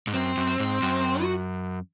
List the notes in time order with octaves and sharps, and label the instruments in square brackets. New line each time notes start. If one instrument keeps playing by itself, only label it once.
[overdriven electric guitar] G#2
[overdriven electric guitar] F#2 [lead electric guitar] C4
[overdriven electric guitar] F#2
G#2
F#2
[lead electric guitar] F#4